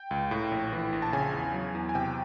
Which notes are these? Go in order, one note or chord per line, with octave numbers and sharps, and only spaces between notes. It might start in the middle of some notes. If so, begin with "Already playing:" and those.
Already playing: G5
C#2
A2
A#1
E3
A#1
A5
C#3 G#5
E2
F#3
E2
G#5
C3 G5